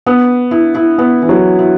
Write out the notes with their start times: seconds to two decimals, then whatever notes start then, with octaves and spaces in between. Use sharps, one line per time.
0.06 B3
0.51 E4
0.75 E4
0.98 B3
1.22 E3
1.29 F#3
1.59 E4